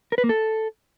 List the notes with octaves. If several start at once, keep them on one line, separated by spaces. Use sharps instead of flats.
A#4
B4
A#3
A4